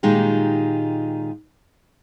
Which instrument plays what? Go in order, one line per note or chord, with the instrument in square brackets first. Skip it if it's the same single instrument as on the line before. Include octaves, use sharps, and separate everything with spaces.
[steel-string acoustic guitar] A#2 D#3 G#3 D#4 F4 G4